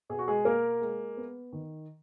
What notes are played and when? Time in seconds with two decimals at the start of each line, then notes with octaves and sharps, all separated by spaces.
0.09 B2 G#4
0.19 F#4
0.28 G#3 G#4
0.45 A#3 A#4
0.81 G#3
1.17 B3
1.53 D#3